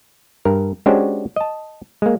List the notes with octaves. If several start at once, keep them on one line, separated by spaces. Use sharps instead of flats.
G2 A#4
G#3 C#4 D4 F#4 G4 C5
D#5 A5
G#3 A#3